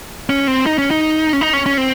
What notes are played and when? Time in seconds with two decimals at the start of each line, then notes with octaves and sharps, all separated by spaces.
0.29 C#4
0.47 C4
0.66 D#4
0.78 C#4
0.91 D#4
1.33 C#4
1.41 D#4
1.53 C#4
1.66 C#4
1.78 C4